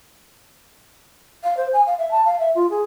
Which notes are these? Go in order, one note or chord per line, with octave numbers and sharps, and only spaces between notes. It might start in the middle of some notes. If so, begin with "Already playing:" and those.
F5
C5
G#5
F5
E5
A5
F5
E5
F4
G#4